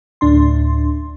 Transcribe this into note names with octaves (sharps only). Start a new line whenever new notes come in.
D2 A2 D4 C6